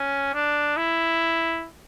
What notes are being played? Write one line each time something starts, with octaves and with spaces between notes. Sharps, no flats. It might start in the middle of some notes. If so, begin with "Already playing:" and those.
Already playing: C#4
D4
E4